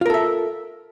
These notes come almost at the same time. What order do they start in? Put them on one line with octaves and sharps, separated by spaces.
F4 A#4 A4 E5